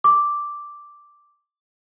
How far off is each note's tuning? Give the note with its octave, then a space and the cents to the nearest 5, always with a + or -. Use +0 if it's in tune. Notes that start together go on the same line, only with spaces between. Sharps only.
D6 -5